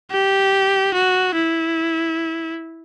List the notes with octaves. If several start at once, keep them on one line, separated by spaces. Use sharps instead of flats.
G4
F#4
E4